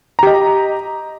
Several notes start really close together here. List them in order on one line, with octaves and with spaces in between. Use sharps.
A#5 G4 D#5